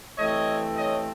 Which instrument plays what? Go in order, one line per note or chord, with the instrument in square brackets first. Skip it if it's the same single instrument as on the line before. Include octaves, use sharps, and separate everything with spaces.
[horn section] G2 E3 A3 C4 C#5 D#5
C#5 D#5